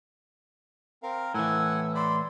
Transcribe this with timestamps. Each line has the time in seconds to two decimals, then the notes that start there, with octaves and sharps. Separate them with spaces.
1.03 C4 A#4 F5
1.34 A2 E3 F#5 G#5 E6
1.95 D5 B5 C6